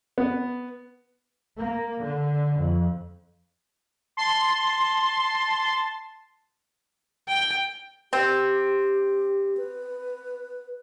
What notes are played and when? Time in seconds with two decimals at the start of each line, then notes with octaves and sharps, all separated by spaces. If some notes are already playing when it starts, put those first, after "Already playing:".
0.18 B3
1.58 A#3
2.01 D3
2.57 F2
4.17 A5 C6
7.29 G5
8.13 C4 G4
9.57 B4